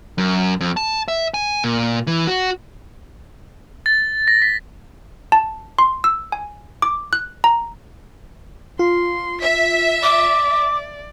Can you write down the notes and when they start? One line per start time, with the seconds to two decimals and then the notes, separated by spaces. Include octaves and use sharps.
0.18 F#2
0.60 F2
0.77 A5
1.08 E5
1.34 G#5
1.64 A#2
2.07 E3
2.27 F#4
3.86 A6
4.28 A#6
4.42 B6
5.32 A5
5.79 C6
6.04 E6
6.32 G#5
6.82 D6
7.13 F#6
7.44 A#5
8.79 F4 C6
9.42 E5 B6
10.03 D5 D6